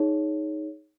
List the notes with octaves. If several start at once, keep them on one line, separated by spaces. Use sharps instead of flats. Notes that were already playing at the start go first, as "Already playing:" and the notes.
Already playing: D#4 G#4 C#5